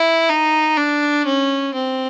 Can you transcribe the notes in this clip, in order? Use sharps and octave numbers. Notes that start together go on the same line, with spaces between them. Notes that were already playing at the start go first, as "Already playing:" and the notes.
Already playing: E4
D#4
D4
C#4
C4